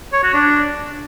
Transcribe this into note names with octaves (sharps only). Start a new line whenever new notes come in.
C#5
F#4
D4